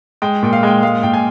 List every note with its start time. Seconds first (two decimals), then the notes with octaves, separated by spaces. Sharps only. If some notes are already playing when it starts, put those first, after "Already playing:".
0.22 G#3 G5
0.42 A#2 G5
0.53 F5
0.63 G#3 G5
0.83 G#3 F5
1.03 A#2 G5
1.13 G#5